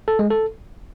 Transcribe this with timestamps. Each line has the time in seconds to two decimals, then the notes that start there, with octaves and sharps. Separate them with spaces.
0.08 A4
0.19 G#3
0.31 A4